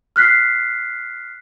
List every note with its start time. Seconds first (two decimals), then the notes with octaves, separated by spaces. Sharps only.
0.16 F6 F#6 B6 C7